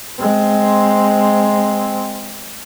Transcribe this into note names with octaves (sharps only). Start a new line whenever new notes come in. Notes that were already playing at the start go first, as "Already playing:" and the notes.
G#3 C4